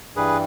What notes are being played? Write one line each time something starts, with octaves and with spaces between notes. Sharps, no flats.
G2 E3 G3 G#4 B4